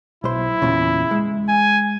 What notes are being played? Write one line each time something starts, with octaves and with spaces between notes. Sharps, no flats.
B1 E4 C5
E2 A#2 C#3
G#3
G#5